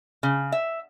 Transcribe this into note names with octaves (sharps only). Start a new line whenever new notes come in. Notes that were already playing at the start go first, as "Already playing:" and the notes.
C#3
E5